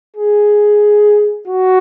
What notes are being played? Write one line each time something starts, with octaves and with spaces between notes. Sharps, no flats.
G#4
F#4